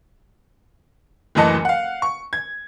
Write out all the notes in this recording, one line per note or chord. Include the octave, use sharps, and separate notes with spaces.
F#1 D2 E3 D#5 A5 C#7
F5 F#5
C#6
G#6